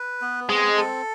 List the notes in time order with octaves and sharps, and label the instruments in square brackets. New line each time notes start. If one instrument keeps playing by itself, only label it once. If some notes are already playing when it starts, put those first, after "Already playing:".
Already playing: [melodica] B4
B3
[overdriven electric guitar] G#3 [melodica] C4
[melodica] A4